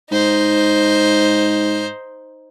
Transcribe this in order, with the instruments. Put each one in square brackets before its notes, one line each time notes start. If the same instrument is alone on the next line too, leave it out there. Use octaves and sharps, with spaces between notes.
[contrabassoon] G#2 [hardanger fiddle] D#4 C5